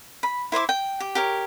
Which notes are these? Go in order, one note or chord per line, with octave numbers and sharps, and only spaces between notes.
B5
E4 C5 E5 D6
G5
G4
G4 A#4 C#5